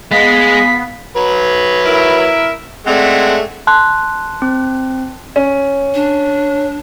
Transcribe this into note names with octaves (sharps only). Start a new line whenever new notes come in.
G#3 B3 F5 B6
F#3 B4
E4 A#4 E5
G#3 A3 C4 D5 F#5
A5 C6 F#6
C4
C#4
D4